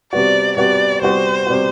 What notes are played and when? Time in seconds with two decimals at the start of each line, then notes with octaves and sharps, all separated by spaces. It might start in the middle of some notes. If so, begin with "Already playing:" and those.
0.13 C3 G3 B3 F#4 D5
0.57 C3 G3 B3 F#4 D5
1.02 C3 G3 B3 F#4 C5
1.46 C3 G3 B3 F#4